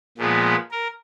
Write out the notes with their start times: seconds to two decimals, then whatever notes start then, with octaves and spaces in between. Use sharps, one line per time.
0.18 A#2 F3 G#3 B3
0.72 A#4